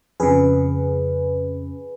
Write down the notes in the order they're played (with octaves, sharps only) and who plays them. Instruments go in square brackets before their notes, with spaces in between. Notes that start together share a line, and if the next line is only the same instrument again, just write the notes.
[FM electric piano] F2 C#3 G#4 B4